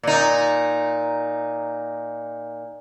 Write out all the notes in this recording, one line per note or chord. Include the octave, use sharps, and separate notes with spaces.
A#2 D#4